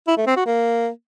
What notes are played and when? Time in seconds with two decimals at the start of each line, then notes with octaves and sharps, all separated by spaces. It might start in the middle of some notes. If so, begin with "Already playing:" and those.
0.08 E4
0.17 A3
0.27 C4
0.36 F#4
0.46 A#3